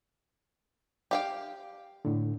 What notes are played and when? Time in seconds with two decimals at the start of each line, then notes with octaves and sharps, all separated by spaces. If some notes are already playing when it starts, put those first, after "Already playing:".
1.11 G4 F5 G5
2.05 A2 D3